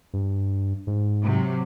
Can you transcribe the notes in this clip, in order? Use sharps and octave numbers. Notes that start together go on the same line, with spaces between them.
G2
G#2
C3 F#3